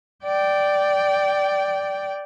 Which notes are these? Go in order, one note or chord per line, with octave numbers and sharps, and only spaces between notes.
D5 G5